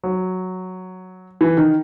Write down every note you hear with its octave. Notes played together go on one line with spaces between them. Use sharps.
F#3
E3
D#3